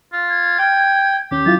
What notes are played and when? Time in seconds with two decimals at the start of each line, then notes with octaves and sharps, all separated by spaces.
0.12 F4
0.30 G#6
0.59 G5
1.31 D#2 C#4 G4
1.46 F#3 E4 F4 A6